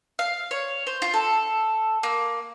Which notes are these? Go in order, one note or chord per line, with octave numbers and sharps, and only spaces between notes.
F5
C#5
C5
F4
A4
A#3